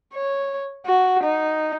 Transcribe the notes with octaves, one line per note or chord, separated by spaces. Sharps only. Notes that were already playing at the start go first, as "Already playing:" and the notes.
C#5
F#4
D#4